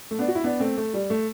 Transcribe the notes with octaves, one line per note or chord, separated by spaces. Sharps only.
A3
B3 D4
F#4
E4
B3 D4
A3 C4
A3
G3
A3